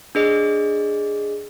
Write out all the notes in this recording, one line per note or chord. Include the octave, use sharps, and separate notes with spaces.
D4 G#4 D#5